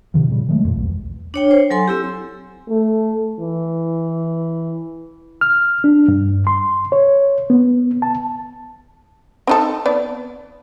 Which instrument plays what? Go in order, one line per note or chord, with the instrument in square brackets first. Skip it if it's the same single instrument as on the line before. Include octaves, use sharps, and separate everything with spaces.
[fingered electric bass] A2 C3 D#3 F3
A#2 C#3 G3
D#3 F#3 G#3 A3
F2 A#2
B1 E2
[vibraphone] D4 C#5 G5
C5
F#3 A4 G#5 C6
C4 E4 G4
[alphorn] A3
E3
[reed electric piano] F6
D4
G2
C6
C#5
B3
A5
[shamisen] C4 D#4 A4
B3 D5